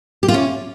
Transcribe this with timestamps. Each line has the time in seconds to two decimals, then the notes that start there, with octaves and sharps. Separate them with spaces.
0.23 G4
0.28 F4
0.34 C#4